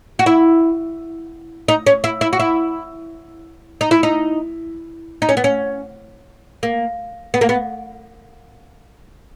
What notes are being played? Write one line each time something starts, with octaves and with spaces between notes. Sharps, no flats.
F#4
E4
D#4
C#4
E4
E4
F#4
E4
D#4
E4
D#4
D#4
C#4
B3
C#4
A#3
B3
A#3
B3